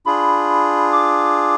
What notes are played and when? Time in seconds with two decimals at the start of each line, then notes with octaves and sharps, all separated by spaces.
0.06 D4 F4 G#4 B5
0.92 D6